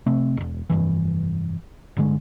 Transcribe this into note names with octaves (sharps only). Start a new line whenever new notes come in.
C3 A3 C4
E1 A#1
F1 A#1 G2 E3
G1 D3 G#3